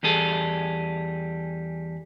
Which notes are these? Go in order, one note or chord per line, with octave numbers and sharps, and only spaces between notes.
E2 G3 G#4 A4